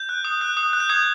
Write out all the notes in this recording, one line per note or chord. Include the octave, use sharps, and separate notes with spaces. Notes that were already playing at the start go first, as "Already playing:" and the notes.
Already playing: G6
F#6
D#6
F#6
D#6
F#6
G6
D#6 G#6